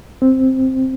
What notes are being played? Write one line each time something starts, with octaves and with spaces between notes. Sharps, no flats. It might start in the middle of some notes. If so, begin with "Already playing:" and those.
C4